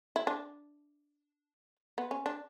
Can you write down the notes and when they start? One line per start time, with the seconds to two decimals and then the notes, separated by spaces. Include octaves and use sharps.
0.16 E4
0.27 D4
1.98 B3
2.11 C#4
2.26 D4